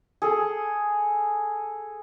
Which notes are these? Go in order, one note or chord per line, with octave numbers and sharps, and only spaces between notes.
G#4 A4